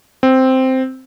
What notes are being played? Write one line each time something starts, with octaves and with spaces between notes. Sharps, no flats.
C4